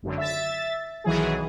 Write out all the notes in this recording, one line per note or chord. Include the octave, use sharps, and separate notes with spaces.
G#1 F#2 D3
E5 A6
B1 D#3 E3 F#3 G#4